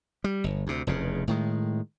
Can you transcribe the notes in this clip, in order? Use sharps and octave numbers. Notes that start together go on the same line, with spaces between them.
G3
G1
D2 C3
F1 E2 C#3
A2 D#3 G#3